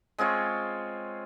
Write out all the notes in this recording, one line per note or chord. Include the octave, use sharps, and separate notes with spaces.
G#3 C4 F4 C#5